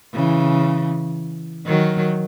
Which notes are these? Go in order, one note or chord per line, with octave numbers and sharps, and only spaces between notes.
C#3 E3
D#3 F#3